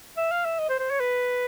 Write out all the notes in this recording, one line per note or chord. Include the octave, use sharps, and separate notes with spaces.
E5
F5
E5
D#5
C5
C5
C#5
B4